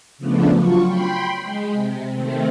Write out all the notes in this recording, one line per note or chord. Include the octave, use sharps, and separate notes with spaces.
C#3 F3 A3 B3 D4
F#3 F4 C#6
G5 B5 C6
G#3
C3
D#3 A3 C4